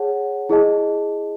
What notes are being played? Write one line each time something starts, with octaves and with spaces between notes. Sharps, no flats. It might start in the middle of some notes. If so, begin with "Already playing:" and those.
Already playing: G#4 C#5 F#5 A5
E4 G#4 D#5 A5